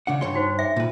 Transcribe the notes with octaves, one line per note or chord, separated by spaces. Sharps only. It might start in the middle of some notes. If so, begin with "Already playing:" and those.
C#3 D4 F#5
G2 C#5 C6
D#4 F#4 C5
E5 G5 D6
A#2 B4